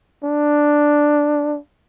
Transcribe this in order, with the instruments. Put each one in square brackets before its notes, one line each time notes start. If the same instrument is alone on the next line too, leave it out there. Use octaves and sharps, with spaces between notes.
[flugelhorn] D4